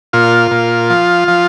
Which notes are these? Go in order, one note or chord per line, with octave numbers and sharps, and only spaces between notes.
A#2 F4
A#2
F3
F3